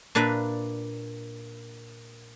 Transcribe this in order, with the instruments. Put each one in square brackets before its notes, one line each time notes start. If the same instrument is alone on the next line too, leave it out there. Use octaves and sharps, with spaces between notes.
[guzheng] A#2 D4 A#4 B4 E5